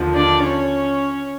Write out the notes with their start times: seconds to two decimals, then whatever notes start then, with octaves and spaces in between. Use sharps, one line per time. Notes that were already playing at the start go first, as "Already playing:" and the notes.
Already playing: D#2 D3 F3
0.14 D4 D5
0.43 C#4 C#5